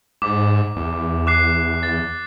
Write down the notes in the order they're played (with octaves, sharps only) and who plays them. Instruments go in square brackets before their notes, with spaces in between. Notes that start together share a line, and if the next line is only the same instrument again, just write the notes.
[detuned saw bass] G#2 [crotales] D6
[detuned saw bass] E2
[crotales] D6 F#6 C7
A6